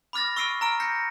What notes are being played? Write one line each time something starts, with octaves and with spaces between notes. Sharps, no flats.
B5 D6 F6 A6 A#6
C#6 E6 F6 C7 D7 D#7
A#5 F6 D7
G6 A#6 C7 C#7